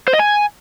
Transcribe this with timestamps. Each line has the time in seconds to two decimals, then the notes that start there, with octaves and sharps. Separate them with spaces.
0.08 C5
0.14 D#5
0.19 G#5